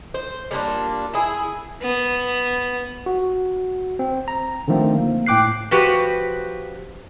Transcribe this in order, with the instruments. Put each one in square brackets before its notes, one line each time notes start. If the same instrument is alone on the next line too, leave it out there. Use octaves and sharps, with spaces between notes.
[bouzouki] C5
G3 A#3 D4 F4
E4 G#4
[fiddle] B3
[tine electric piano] F#4
C4
A#5
D3 D#3 F3 A3 C4
A#3
A2 G5 D6 F#6 C7
[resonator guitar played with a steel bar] F3 F#4 G4 B4